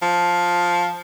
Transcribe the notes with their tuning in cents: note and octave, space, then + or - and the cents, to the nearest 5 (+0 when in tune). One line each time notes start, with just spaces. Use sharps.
F3 +5